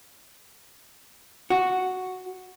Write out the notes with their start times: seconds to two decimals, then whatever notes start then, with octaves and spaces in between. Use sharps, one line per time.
1.50 F#4